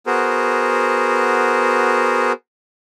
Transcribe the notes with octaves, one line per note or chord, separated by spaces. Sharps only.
B3 F#4 G#4 A#4 C5